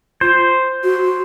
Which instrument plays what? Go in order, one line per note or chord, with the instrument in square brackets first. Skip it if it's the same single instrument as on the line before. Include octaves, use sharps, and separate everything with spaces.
[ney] F4 [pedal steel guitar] C5
[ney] F#4
F#4